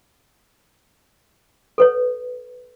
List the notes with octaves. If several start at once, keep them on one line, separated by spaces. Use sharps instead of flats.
A4 B4 C#5